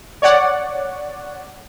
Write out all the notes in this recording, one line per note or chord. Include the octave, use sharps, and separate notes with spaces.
C#5 D5 F#5